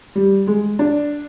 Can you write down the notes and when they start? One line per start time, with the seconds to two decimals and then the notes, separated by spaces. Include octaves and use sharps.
0.15 G3
0.47 G#3
0.79 D4